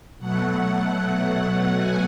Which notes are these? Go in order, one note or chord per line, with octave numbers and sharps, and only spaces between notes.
B2 F#3 A3 F#5
G#5